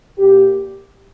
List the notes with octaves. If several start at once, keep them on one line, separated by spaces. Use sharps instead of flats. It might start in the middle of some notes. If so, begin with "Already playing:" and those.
A#2 G4